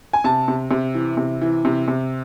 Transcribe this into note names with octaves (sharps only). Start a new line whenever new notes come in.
G#5
C3 A5
C3
C3
E3
C3
E3
C3
C3